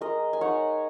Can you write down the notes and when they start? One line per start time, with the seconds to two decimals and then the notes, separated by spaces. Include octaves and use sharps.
0.01 G#3 A#4 D#5
0.33 G#5
0.41 D#4 C#5 F#5